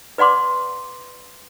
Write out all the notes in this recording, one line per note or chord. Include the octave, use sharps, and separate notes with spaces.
B4 D5 F#5 C6 D6